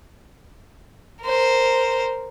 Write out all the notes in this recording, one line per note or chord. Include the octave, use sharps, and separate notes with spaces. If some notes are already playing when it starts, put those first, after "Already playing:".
A#4 C5